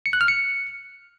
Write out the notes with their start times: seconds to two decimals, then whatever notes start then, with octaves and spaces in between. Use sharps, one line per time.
0.06 C#7
0.13 F#6
0.21 F6
0.28 C#7